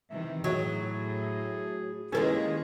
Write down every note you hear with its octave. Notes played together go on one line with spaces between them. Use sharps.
C3 D#3 E3 E5
A2 F#3 G#4
D#3 G#3 A#3 C#4 E4 G4 G#4 B4